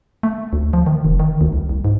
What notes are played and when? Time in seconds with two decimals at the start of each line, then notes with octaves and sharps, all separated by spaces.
0.23 A3
0.53 D2
0.73 F3
0.86 D#3
1.04 F1
1.20 D#3
1.41 D2
1.53 C2
1.69 C2
1.85 G#2